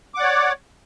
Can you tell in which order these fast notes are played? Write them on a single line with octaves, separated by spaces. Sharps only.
D6 F#5 D5 C#5